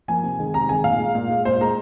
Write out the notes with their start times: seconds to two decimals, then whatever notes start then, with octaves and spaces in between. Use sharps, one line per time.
0.08 F3 A#3 G#5
0.24 C3
0.39 D#3 G#3
0.54 C3 A#5
0.69 D#3 G#3 G#5
0.84 A#2 F5
0.99 G#3
1.15 A#2
1.30 G#3
1.45 A#2 C5
1.61 G#3 A#5